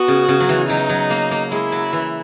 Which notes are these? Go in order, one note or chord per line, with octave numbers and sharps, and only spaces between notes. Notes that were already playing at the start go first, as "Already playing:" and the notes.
Already playing: B3 F#4
C#3
C#3
F#3
E3
F#3 D#4
F#3
A#3
A#3
G#3 E4
F#3
E3